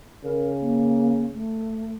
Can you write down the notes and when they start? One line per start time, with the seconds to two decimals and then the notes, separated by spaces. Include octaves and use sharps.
0.24 C#3 A#4
0.61 A#3
1.34 A3